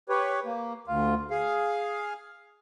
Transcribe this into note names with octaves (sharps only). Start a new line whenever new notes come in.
G4 B4 C#5
A#3
D2 F4
G#4 F5